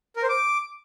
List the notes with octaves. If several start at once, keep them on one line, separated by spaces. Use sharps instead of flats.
A#4
C5
D6